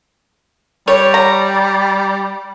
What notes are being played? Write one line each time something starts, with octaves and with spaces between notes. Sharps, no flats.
G3 C#5
A#5